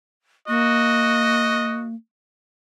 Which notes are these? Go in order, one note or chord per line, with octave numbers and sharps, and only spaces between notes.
A#3 F#4 D#5